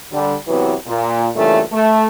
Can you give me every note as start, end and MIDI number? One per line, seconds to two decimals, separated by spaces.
0.13 0.34 50
0.13 0.34 55
0.48 0.73 48
0.48 0.73 52
0.48 0.73 54
0.48 0.73 59
0.87 1.29 46
1.35 1.62 43
1.35 1.62 46
1.35 1.62 49
1.35 1.62 52
1.35 1.62 57
1.72 2.07 57